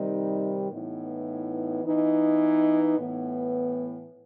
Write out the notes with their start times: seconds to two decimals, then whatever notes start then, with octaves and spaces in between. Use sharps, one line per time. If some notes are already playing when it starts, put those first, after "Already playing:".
Already playing: C3 D#3 G3 D#4
0.71 A2 E3 B3 D#4
1.84 E3 B3 D#4
2.98 A2 E3 B3